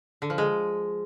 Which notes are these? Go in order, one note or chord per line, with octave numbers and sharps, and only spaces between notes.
D3
F3
G#3